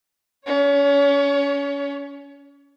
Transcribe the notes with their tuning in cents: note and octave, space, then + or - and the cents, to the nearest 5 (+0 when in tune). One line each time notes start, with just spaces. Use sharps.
C#4 +30 C#5 +0